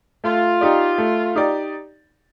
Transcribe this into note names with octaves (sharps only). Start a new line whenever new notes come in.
A3 F4
D#4 G4 D5
A3
D#4 G4 D5